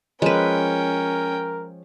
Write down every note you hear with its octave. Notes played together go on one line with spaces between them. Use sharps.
F3 G#3 C#4 A#4 B4 C#5 G5